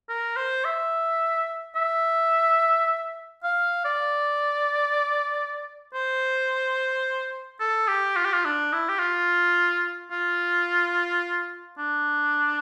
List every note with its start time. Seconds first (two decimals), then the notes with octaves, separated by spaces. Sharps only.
0.09 A#4
0.36 C5
0.65 E5
1.76 E5
3.44 F5
3.84 D5
5.94 C5
7.60 A4
7.88 G4
8.16 F4
8.25 G4
8.33 F4
8.45 D4
8.73 E4
8.89 G4
8.99 F4
10.11 F4
11.78 D4